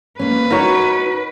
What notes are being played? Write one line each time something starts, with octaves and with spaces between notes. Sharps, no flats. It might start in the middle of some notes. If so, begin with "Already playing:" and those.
A#3 C#4 B4
D#4 F#4 A#4 C#5